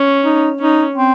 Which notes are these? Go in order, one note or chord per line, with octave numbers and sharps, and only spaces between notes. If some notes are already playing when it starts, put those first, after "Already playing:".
Already playing: C#4
D#4
C#4 D#4
C4